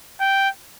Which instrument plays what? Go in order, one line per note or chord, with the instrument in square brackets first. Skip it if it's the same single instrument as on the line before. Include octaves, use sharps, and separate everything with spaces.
[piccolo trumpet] G5